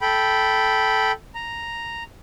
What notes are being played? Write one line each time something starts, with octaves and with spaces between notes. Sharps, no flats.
A4 G5 B5
A#5